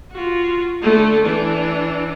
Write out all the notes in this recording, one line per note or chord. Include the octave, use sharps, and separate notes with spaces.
F4 F#4
D3 A3
E3 D4